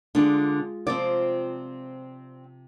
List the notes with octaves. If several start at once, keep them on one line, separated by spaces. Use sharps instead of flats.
D3 G#3 D4 F4
C3 F3 C4 D5 F5